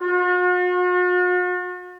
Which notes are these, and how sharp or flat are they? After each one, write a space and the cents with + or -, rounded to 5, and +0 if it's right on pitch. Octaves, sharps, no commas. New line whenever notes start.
F#4 -45